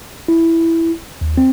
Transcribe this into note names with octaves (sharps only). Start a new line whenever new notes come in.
E4
D#2
C4